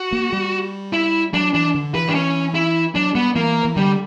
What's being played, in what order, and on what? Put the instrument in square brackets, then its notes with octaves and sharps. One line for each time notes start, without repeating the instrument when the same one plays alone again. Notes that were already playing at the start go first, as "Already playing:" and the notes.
Already playing: [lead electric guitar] F#4
[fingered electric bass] A#3
G3
[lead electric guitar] E4
[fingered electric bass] F#3 [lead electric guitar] D4
[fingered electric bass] E3 [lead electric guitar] D4
[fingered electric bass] D3
[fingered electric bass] E3 [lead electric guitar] B4
[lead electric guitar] D4
C#4
E4
[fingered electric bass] F#3 [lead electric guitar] D4
[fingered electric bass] G3 [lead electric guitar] B3
[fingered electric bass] E3 [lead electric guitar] A#3
[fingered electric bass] E3
[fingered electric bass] D3 [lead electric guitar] G3